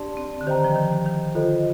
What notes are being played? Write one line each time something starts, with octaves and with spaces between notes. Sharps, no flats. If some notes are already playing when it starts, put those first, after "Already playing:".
Already playing: D4 G4 D5 A5 C6
C4
D3
D#3 G4 C5 D#5 G5 A#5
F3
D#3
D#3
D3 F4 A4 C5 D#5